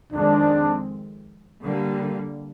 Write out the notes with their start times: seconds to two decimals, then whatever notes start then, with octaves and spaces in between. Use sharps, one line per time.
0.13 F2 D#3 G#3 C4 D4
1.62 D3 G3 A#3